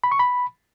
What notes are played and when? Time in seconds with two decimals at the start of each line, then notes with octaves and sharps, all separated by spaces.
0.04 B5
0.12 C#6
0.19 B5